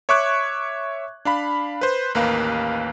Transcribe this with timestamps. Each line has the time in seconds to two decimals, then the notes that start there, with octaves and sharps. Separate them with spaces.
0.09 C#5 E5 C#6 D6 F#6 G#6
1.25 D4 F5 B5
1.81 B4 C5
2.15 A1 D#2 A#3 A#4 B4 F5